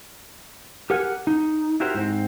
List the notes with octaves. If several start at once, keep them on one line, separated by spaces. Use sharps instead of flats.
G4 A#4 F#5 G#5
D#4
E4 F#4 G4 A#4 C5
G#2 C4